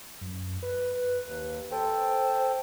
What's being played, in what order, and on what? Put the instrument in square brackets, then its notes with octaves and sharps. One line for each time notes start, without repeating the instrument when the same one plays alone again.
[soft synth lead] F#2
B4
[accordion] D#2
[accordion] A4 G5 [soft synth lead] C5